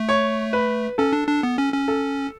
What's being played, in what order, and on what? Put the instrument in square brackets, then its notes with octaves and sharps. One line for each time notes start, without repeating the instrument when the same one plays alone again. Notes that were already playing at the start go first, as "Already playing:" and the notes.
Already playing: [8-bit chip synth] A3
[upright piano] C#5
B4
[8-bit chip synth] C#4 [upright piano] A4
[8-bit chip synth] D4
D4
B3
C#4
C#4
[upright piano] A4